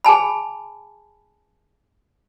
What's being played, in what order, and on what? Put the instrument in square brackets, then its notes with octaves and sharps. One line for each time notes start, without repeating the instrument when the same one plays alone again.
[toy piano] G#4 G#5 A5 B5